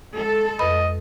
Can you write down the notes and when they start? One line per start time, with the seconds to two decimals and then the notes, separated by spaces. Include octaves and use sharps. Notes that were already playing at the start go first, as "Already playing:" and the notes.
0.14 G#3 A4
0.59 F2 B4 D#5 B5